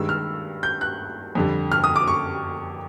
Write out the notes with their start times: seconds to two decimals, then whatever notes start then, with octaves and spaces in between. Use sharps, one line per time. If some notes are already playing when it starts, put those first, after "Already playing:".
Already playing: G2 D#3 G#3 E6
0.09 F6
0.63 G6
0.81 F#6
1.35 F2 D3 G3
1.72 F6
1.84 D#6
1.96 D6
2.08 C#6